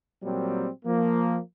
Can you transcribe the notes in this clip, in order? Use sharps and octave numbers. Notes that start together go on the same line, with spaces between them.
A#2 F#3 G3 A#3 C4
F3 A#3